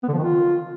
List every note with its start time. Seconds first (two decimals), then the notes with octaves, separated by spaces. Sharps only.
0.03 B3
0.08 D3
0.13 F3
0.18 D#3
0.23 F4